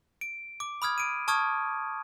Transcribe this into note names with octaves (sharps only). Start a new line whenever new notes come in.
D7
D6
B5 D#6 F6 G#6
D7 D#7
A5 C#6 D#6 F6 G#6